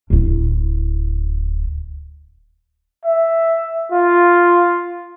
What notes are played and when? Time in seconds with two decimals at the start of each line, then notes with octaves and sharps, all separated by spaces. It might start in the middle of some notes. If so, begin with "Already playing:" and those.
0.10 D1 E4
3.05 E5
3.92 F4